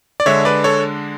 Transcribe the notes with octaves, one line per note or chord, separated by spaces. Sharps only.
D5
D3 G#3 D4 C#5 E5
B4 D5
A4 C#5